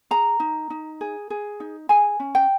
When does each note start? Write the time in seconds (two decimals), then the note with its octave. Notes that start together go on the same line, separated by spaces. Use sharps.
0.11 G#4 A#5
0.40 D#4
0.70 D#4
1.01 G#4
1.30 G#4
1.60 D#4
1.89 G#4 G#5
2.20 C#4
2.35 G5